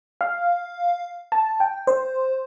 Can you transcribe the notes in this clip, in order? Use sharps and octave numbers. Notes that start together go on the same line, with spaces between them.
F5
A5
G5
C5